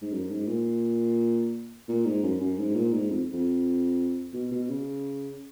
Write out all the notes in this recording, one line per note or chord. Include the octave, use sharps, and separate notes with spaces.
G#2
F#2
G#2
A#2
A#2
G#2
F#2
F#2
G#2
A#2
G#2
F2
F2
B2
B2
C#3